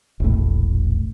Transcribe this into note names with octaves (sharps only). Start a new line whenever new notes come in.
E1 A#1 A2